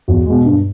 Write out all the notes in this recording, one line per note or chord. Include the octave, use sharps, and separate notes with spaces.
E2 F#4
B2 G#3
G2